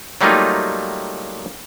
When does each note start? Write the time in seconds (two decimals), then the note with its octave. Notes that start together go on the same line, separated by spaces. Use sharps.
0.21 F#3 G3 A3 A#3 D#4 F4